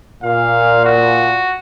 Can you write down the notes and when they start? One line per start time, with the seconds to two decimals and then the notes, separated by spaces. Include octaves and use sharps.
0.23 A#2 F5
0.85 F#4